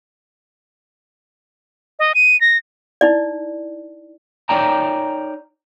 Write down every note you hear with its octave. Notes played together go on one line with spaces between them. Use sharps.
D#5
D#7
A#6
D#4 E4 D5
D#4 A#4 C#5 D5 G5 A#5